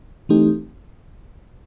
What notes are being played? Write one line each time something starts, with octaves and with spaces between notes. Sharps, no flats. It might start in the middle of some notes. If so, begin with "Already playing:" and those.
E3 A3 C4 D#4 G4